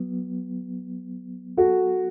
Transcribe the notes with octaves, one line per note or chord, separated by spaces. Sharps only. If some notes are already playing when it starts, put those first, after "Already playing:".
Already playing: F#3 B3
F#4 A4